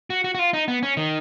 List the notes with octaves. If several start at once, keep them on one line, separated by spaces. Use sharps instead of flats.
F#4
F#4
F#4
F4
D#4
B3
C#4
D#3